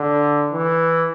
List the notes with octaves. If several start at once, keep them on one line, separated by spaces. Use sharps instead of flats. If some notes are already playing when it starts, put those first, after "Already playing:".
Already playing: D3
E3